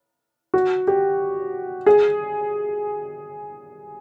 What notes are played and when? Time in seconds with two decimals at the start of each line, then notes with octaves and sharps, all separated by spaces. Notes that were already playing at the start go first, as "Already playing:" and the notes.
0.54 F#4
0.87 G4
1.86 G#4